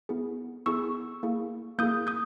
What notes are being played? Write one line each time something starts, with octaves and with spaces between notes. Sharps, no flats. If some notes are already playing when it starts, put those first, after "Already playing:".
B3 E4 G#4
B3 E4 G#4 C#6 E6
A#3 E4 G#4
A#3 E4 G#4 D#6 G6
D#6 G6